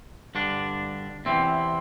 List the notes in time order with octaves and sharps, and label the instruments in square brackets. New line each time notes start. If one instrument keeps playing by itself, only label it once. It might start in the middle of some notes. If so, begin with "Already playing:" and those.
[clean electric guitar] G2 D3 D4
E2 C3 E3 C4